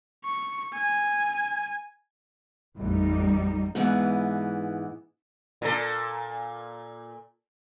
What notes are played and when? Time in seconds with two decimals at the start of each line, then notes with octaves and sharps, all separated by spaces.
0.24 C#6
0.74 G#5
2.76 A1 F2 G3 D#4
3.75 G#2 E3 B3
5.62 A#2 A4